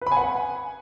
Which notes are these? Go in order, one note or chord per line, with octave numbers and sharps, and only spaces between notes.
B4
B5
G#5
F#5